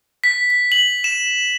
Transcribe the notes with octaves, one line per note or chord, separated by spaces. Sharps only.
B6
B6
F#7
E7